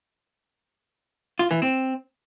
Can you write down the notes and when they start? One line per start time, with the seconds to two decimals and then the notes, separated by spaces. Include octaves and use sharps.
1.39 F4
1.51 E3
1.62 C4